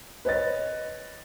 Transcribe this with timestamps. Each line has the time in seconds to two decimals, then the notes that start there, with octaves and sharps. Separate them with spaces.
0.25 B4 C#5 D#5 A6